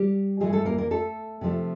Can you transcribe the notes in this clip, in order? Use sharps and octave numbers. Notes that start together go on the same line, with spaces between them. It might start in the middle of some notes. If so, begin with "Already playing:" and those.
Already playing: G3 G4
G2 E3 G#3 A3 G#4
A3 A4
A#3 A#4
A#3 A#4
A3 A4
C3 F3 A3